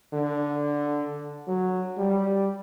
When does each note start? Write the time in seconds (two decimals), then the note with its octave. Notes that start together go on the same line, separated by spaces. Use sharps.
0.13 D3
1.47 F#3
1.98 G3